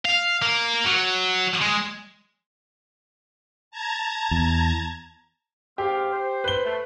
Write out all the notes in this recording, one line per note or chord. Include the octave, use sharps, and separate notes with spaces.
F5
A#3
F#3
G#3
A5 A#5 G#6
E2
G#2 C4 G4 F5
C5
B4 G7
A3